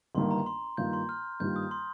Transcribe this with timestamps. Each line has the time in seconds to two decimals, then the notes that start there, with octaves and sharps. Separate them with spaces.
0.15 G1 G2 D#3 A#3 C6
0.31 A#5
0.46 C6
0.77 G2 D#3 A#3 F4 G6
0.93 C6
1.09 F6
1.40 G2 D#3 G3 A#3 F4 G6
1.56 D#6
1.71 C6